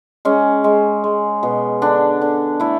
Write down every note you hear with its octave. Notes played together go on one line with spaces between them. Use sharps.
G#3 C#4
G#3
G#3
B2
D3 D4
D3
A3 E4